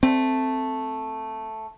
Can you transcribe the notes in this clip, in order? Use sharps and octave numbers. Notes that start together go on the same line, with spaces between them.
A3 C4